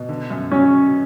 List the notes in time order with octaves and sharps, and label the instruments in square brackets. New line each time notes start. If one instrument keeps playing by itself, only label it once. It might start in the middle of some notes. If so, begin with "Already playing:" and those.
Already playing: [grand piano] B2
D3
F#2
[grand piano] F#3 [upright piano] C#4